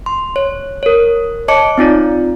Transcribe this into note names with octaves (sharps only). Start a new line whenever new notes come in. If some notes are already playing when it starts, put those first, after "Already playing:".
C6
C#5
A#4 C#5
C#5 D#5 A5 D6 C#7
C4 D#4 F4 D5